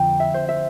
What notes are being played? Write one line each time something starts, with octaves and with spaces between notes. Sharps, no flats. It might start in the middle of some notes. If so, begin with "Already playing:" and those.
Already playing: F2 D3 F3 G5
E5
C5
E5